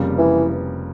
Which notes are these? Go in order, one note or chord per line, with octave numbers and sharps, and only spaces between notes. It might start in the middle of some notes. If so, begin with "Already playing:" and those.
Already playing: F1 F2 C#3 G3 A#3
E3